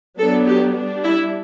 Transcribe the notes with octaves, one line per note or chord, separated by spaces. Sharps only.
F#3 B3 D4 A4
G4
G3 D4
E4